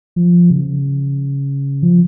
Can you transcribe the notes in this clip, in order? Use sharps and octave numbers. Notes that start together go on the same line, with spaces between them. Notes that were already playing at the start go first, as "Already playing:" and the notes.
F3
C#3
F3